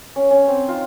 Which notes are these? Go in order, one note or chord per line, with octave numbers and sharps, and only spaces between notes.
C#4
C#4
C4
D#4 F4